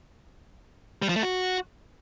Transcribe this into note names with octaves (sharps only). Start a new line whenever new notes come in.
G3
F3
A3
F#4